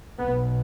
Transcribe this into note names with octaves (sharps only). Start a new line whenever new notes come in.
B1 B2 B3